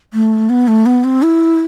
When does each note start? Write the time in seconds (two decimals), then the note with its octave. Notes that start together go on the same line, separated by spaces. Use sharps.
0.13 A3
0.50 B3
0.68 A3
0.86 B3
1.04 C4
1.23 E4